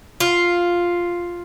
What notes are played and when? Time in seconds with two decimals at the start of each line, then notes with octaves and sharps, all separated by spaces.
0.20 F4